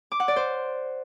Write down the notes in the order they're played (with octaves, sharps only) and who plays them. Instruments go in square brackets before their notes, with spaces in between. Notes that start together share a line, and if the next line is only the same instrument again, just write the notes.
[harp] D6
F#5
D5
C5